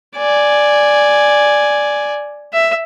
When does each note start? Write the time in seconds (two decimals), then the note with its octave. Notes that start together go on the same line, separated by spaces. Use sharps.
0.17 D5 G#5
2.53 E5